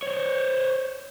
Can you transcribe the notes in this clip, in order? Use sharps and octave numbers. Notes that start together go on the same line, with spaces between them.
C5 C#5